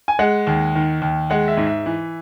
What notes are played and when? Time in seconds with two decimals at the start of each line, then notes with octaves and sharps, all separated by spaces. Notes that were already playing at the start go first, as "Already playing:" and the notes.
0.08 G#5
0.19 G#3 F#5
0.47 D#2
0.75 D#3
1.02 D#2
1.30 G#3 F#5
1.48 E5
1.57 G#2
1.67 E5
1.86 E3